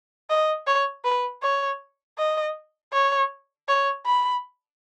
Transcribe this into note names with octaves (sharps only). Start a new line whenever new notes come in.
D#5
C#5
B4
C#5
D#5
C#5
C#5
B5